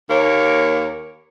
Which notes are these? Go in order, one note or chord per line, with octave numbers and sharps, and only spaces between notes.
D#2 A#3 C#5